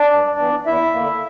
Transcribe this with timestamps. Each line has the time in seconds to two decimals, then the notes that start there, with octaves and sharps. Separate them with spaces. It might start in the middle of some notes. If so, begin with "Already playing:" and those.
Already playing: D4 D5
0.11 G2
0.39 E3 B3
0.66 E2 E4 E5
0.94 D3 A#3